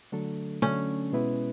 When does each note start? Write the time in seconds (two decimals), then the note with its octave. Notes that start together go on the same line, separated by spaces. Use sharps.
0.12 D3 F#3 A3 D4 A4
0.62 D3 F#3 A3 C#4 D4 A4
1.13 B2 G#3 B3 E4 B4